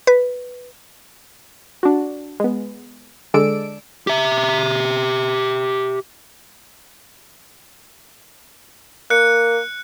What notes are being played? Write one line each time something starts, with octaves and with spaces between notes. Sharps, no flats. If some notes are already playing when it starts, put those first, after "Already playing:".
B4
D4 F#4
G#3 B3
D3 G#3 A4 D5 E6 D7
G4 E5
A#3 F#6 C#7